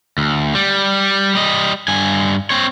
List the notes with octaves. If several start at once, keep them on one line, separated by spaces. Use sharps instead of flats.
D2
G3
G3 D#5
G2 G#5
C4 C#5